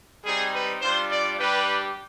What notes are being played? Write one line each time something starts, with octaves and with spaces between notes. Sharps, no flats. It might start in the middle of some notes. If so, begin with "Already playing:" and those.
G3 C4 D#4 G#4
B4
G3 D4 F4 C5
D5
G3 D4 G4 B4